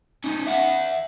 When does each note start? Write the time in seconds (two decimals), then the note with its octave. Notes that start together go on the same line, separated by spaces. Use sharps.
0.24 C#4 D#4
0.47 E5 F#5